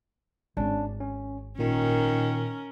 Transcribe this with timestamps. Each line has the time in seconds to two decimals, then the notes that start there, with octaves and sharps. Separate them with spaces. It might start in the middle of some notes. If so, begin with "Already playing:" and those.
0.57 G#1 C#4 D4
1.00 C#4
1.59 A#2 D#3 C#4 A#4